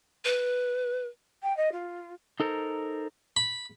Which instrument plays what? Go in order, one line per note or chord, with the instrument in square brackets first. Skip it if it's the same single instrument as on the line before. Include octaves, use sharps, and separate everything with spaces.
[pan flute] B4
[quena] G5
D#5
F4
[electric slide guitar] D#4 A4 A#4 C5
[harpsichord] B5